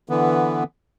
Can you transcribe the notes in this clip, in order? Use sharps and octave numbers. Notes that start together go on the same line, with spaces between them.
D3 E3 B3